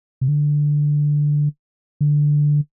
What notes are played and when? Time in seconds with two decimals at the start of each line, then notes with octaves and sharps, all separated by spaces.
0.21 C3
0.28 D3
2.01 D3